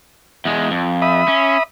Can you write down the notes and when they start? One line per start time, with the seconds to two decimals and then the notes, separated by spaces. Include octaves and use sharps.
0.45 E2 G#3
0.71 F2
1.02 E5 B5 D#6
1.28 C#4